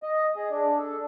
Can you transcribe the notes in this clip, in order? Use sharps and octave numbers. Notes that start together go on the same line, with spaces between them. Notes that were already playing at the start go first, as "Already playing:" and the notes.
D#5
G#4
D4
A4